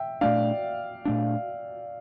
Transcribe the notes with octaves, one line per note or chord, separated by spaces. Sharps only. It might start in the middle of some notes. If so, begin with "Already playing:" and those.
Already playing: E5 G5
A#2 A3 D4 D5 F5
A#2 A3 D4